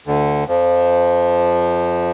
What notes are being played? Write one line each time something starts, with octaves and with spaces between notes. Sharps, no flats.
D2 D3
F2 F3